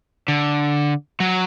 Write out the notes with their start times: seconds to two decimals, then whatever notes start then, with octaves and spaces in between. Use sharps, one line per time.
0.28 D3
1.20 F#3